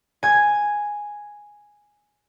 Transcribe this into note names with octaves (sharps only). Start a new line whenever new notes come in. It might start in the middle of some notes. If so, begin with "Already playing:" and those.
G#5 G#6